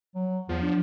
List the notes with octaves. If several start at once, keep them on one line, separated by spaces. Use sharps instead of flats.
F#3
E2 F3
D4